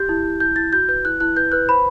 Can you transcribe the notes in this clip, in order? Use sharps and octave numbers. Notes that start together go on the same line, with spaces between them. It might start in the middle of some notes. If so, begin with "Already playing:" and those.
Already playing: G4 G6
E4
E4
E4 G6
E4 A6
F#4 G6
B4 G6
E4 F#6
E4 F#6
B4 G6
B4 F#6
C5 B5